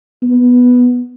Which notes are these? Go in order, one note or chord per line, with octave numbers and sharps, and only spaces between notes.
B3